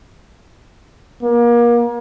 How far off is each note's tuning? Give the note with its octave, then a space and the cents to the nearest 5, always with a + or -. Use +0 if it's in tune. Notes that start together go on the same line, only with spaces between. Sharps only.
A#3 +30